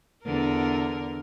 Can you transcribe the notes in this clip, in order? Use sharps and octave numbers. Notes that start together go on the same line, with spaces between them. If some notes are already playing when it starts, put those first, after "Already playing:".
E2 D3 A#4